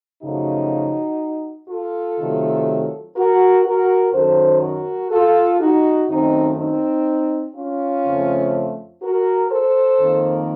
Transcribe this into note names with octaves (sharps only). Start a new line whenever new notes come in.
F#2 C#3 F3 A3 D#4 F#4
F4 A4
C3 D#3 F#3 A3
F#4 A#4
F#4 A#4
F#2 D#3 F#3 A4 C5
F#4 A#4
F4 A4
D#4 F#4
F#2 D#3 A3 C4 D#4
C4 D#4
C#4 F4
F2 C#3 F3 A3
F#4 A#4
A4 C5
F2 D#3 A#3